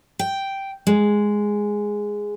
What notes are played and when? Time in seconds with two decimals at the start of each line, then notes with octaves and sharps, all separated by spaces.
0.19 G5
0.87 G#3